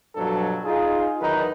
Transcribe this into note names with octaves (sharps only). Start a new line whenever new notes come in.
G2 B2 F3 F#3 D4 A4
D#4 F4 G#4
E2 D#3 F#3 D#4 B4